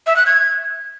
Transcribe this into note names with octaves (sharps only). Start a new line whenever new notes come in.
E5
F#6
G#6